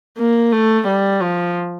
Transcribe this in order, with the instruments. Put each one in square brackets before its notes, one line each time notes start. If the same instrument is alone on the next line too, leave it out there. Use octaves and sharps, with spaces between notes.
[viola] A#3
A3
G3
F3